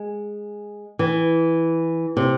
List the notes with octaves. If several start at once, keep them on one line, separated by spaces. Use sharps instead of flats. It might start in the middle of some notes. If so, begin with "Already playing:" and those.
Already playing: G#3
E3
C3